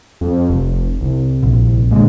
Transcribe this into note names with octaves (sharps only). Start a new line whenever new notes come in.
F2
F1
C2
A#1
A#2 D3 G#3